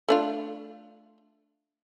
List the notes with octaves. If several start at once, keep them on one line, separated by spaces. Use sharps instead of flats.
A3 D4 F4